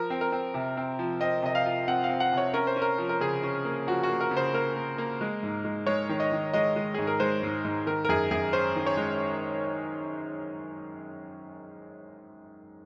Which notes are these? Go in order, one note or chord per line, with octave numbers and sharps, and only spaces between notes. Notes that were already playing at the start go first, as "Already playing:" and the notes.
Already playing: F3 A#4
C4
A#4
C4
C3
C4
F3
C4 D#5
C3 D#5
F5
F4
C4 F#5
F5
C4
F#5
C3
C#5
C#4 A#4
C5
C#4
A#4
F3
A#4
C#3 G#4
C#4
A#3
F3 F#4
F#4
A#3
A#4
C#3
C5
A#3 A#4
A#3
A#3
G#3
G#2
G#3
G#3 C#5
D#3
D#5
D#3
G#3 D#5
G#3
G#2 G#4
A#4
G#3 C5
G#2
G#2
D#3 A#4
A#4
F#2 G#4
F#2 G#4
C#4 C5
D#3
C#5
G#3